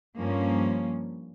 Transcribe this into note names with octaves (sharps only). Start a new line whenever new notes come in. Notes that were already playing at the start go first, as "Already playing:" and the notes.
G2 F3 A#3 C#4